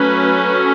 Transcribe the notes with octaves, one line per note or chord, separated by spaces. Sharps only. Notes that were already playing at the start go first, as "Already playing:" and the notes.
Already playing: F#3 A3 C#4 B4